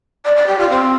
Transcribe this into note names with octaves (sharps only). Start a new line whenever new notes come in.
D5
D5
G4
F4
C4